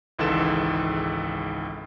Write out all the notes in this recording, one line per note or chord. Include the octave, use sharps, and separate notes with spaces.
G#1 C#2 G#2 E3 A4 E7